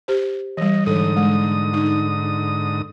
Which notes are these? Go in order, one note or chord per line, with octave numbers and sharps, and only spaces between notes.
G4 C5
E3 G3 D#5
G#2 D3 E3 A4 D#6
G#3
D#4